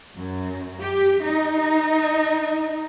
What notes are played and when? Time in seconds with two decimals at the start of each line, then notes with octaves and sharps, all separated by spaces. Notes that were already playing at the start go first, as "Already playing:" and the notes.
0.16 F#2
0.81 G4
1.25 D#4